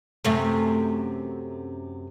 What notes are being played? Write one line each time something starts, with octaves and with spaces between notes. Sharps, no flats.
F#2 C3 A3